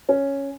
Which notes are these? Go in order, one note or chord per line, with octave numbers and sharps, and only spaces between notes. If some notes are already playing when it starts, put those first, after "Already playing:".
C#4